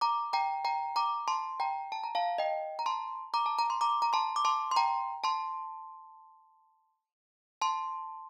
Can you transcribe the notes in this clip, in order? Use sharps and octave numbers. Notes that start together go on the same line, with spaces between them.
A#5 D6
G5 A#5
G5 A#5
A#5 D6
A5 C6
G5 A#5
A5
A#5
F5 A5
D#5 G5
A#5
A5 C6
A#5 D6
A5
A#5
C6
A#5 D6
A#5
A5 C6
D6
A5 C6
C6
G5 A#5
A5 C6
A5 C6